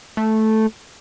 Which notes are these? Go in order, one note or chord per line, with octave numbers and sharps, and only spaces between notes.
A3